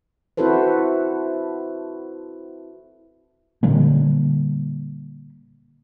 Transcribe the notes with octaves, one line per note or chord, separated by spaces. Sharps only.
C4 E4 F#4 A4 B4 C5
A#2 D3 G3 A#3